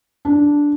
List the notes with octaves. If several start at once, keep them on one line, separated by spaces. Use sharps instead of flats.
D4